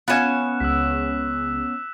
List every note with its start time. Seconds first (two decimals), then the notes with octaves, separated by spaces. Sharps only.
0.08 B3 C#4 F4 G#5 F#6 E7
0.60 C#2 E6 B6